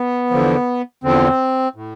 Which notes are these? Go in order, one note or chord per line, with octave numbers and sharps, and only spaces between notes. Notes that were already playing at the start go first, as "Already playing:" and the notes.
Already playing: B3
E2 D3 F3
E2 D3 F3 C4
A2